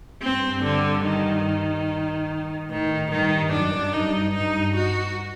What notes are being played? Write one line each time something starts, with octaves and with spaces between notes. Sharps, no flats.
G2 C4
D3
D#3
A2 D#3
G2 D#3
F#2 D4
G2 D#4
G2 D#4
F#4